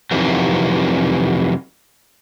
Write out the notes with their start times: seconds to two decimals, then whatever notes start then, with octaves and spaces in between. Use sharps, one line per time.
0.11 F2 C3 D#3 E3 F#3